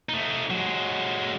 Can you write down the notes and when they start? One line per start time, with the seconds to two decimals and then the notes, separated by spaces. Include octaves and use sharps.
0.09 A3 D#4
0.50 F#3 G#3